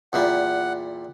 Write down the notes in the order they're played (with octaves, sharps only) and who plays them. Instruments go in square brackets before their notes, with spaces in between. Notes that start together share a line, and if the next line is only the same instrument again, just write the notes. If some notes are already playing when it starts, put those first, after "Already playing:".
[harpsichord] E2 A#2 G3 [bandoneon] F#5